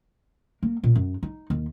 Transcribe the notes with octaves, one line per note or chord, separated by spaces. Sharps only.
A#3
A#2
F#2
D#4
D#2